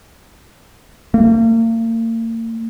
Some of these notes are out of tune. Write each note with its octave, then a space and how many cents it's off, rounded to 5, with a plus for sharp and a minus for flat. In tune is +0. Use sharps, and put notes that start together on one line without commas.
A#3 -40